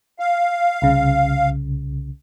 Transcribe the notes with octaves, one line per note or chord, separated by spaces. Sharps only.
F5
C2 C#3